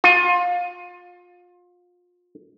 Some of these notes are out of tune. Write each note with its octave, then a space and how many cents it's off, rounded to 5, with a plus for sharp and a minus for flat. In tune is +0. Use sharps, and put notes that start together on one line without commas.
F4 +30